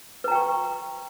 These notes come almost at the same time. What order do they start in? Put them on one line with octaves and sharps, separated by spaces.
B4 A#5 G5 C#6